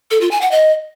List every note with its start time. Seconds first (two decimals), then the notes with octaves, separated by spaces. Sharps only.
0.11 A4
0.21 F4
0.31 G#5
0.41 F#5
0.51 D#5